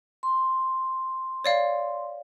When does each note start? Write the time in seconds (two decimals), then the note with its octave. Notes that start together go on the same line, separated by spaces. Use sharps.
0.23 C6
1.44 C#5 D5 F5